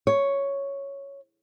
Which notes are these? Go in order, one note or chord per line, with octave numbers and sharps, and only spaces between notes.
C#5